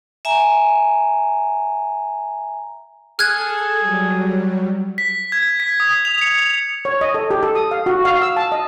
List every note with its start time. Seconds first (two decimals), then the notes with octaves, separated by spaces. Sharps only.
0.25 E5 G#5 A#5
3.19 G#4 A4 F6 F#6 G#6
3.79 F#3 G3
4.98 B6
5.32 G#6
5.60 B6
5.80 D#6
6.05 F7
6.21 C#7
6.85 C#5
7.01 D#5
7.14 A4
7.30 G4
7.43 A4
7.55 D#6
7.71 F5
7.86 F#4
8.05 F5
8.22 E6
8.37 A5
8.52 D#5